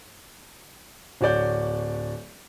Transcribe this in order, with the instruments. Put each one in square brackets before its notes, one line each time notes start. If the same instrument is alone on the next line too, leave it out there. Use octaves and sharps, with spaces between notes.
[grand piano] D1 F#4 C#5 D5 G6